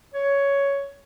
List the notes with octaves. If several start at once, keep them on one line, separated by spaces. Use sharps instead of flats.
C#5